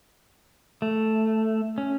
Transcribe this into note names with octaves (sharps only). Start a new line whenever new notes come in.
A3
C#4